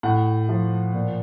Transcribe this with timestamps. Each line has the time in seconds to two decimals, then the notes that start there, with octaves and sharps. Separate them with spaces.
0.03 A2 F#5
0.49 F3
0.94 A#2